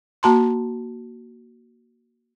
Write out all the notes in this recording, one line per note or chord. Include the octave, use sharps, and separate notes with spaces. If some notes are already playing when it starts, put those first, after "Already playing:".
A#3 F#4 A5 A#5 C6